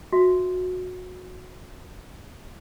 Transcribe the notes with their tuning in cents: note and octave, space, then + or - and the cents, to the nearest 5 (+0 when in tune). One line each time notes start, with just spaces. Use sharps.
F#4 -20 E5 +0